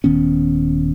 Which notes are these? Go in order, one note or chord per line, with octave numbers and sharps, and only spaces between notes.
D#1 D#3 B3 C#4